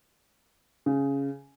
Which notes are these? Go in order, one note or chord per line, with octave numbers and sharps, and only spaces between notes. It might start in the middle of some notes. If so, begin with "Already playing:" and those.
C#3